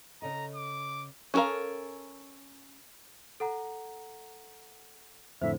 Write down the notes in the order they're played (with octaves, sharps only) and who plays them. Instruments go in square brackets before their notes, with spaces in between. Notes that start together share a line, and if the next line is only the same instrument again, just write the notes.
[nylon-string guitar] C#3 A4 D#5 [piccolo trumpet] A#5
[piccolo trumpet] D6
[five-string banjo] C#4 F4 A4 A#4 F5
[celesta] A4 F#5 A#5
[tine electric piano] F2 A2 D3 [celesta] C5 [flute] E5